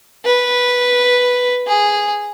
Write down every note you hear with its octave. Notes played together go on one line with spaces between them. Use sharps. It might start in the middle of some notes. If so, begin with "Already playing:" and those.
B4
G#4